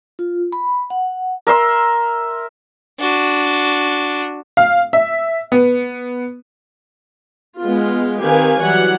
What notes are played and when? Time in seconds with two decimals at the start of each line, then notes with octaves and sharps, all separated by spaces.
0.19 F4
0.52 B5
0.90 F#5
1.47 A#4 E5 C6 E6
3.00 D4 F#4
4.57 F5
4.93 E5
5.52 B3
7.60 G#3 B3 F4
8.23 D#3 C4 G4 B4 F5 G#5
8.61 E3 F#3 G3 C#5 F#5